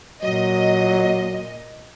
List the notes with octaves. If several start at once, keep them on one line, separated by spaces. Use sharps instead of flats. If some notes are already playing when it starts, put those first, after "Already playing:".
A#2 F#3 D#5